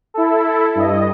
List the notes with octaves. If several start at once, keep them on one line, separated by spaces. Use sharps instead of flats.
E4 A4
G2 D#5